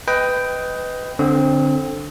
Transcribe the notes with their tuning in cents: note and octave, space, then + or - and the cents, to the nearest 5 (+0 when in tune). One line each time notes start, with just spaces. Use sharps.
B4 +20 D#5 +10 G5 +0
D3 +0 C4 +15 D#6 +45